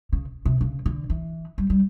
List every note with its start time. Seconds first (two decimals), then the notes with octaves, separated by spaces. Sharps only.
0.13 C#3
0.45 C3
0.61 C#3
0.86 D3
1.10 E3
1.58 G3
1.70 G3